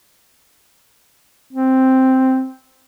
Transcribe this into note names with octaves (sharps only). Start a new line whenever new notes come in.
C4